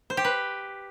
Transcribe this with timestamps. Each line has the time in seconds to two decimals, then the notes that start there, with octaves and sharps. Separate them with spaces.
0.10 C5
0.17 G4
0.25 B4